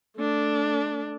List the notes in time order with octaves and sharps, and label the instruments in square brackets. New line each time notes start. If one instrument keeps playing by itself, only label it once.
[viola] A3 D4